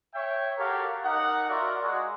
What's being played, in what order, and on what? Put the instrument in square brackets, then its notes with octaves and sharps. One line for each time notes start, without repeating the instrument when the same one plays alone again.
[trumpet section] C#5 E5 G5
F#4 G4 A4 A#4 C#5 F5
D#4 A#4 F#5
F4 F#4 A#4 D5 E5 F#5
G#3 F#4